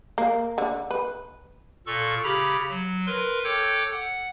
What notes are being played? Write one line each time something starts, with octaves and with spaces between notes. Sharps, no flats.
A#3
D3
B4
A#2 A4 C#6 F6
C#3 G4 A#5 B5
F#3
A#4 B4 C6
A4 C#5 G5 D6 F#6 G6
F#5